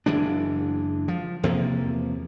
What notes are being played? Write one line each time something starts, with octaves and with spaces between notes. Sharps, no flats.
F#1 E3 G#3 D4
F3
E2 C3 F3 A#3